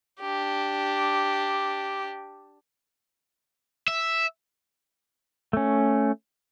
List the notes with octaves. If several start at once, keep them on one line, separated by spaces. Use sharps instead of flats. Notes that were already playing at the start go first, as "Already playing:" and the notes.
D4 G4
E5
A3 C#4